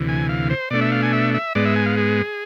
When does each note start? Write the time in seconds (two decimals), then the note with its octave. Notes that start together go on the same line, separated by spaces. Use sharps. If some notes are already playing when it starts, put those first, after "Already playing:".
Already playing: D2 C3 E3
0.08 G#5
0.29 F5
0.50 C5
0.70 B2 A3 D4 D5
0.81 E5
0.92 F5
1.02 G#5
1.13 E5
1.34 E5
1.55 G#2 G#3 B3 D5
1.65 E5
1.76 G#5
1.86 F5
1.97 G#4